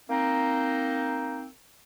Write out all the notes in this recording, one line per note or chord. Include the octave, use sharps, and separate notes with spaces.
A#3 C4 D#4